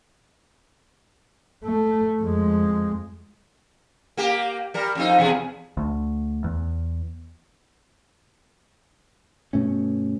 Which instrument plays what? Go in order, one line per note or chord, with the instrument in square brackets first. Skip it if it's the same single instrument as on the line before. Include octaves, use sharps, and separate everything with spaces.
[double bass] A3
F2 G#3
[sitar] A#3 G4
G3 A#4
F2 C4 D#4
E2 B2 G#4
[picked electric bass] D2
E2
[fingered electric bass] G2 B2 A3 C#4